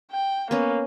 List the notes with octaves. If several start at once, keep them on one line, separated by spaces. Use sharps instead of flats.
G5
A#3 B3 C#4